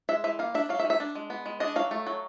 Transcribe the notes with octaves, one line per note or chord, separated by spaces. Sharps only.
G#3 E5
E3 E5
A#3 F5
D4 E5
F#3 F5
E5
D#3
E5
D4
G#3
B3
G#3
D4 D#5
F#3 F5
A3
F#3